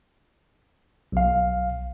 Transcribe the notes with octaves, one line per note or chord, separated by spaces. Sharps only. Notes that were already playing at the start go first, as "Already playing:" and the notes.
B1 F5